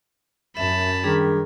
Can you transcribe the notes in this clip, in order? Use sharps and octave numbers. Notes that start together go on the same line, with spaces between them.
F#2 E5 A5 B5
D#3 G3 D4 G#4